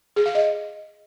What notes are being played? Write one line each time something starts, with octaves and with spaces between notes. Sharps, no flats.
G#4
F5
D#5